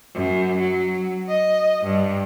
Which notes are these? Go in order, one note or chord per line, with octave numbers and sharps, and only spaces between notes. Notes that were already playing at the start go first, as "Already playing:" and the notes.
F#2
F#3
D#5
G2